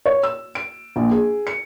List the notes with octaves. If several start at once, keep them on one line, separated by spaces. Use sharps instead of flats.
C#5
E6
D7
A#1
G#4
C#7